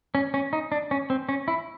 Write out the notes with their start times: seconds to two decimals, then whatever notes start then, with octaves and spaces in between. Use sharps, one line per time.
0.15 C#4
0.34 C#4
0.53 D#4
0.72 D4
0.91 C#4
1.10 C4
1.29 C#4
1.48 E4